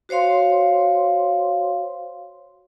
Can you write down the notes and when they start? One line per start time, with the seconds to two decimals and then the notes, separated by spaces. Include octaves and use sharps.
0.09 F#4 C5 C#5 F5 C6